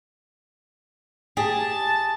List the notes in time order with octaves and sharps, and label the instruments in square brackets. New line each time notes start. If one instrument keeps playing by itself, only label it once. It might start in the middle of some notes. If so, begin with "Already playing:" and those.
[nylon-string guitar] G4 G#4 [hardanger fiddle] A5